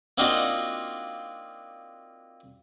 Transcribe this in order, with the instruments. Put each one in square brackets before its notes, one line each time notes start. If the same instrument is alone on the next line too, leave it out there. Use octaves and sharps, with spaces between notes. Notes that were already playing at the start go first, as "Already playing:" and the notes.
[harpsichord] A#3 C4 D4 D#4 F4 F#4